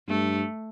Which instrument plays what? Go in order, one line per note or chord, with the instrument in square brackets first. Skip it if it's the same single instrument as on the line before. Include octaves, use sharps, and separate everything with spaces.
[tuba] G2 [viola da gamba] A3